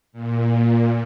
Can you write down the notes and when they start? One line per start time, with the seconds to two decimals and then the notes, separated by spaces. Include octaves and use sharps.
0.13 A#2